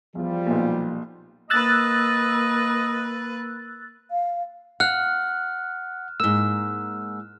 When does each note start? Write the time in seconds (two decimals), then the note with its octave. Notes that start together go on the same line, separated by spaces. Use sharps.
0.15 E2 F3 G3 F4
0.47 B1 A#2
1.50 A#3 B4 D#5 E6 F#6 A6
4.11 F5
4.80 F5 F#5 F6 F#6
6.20 G#2 A#3 E6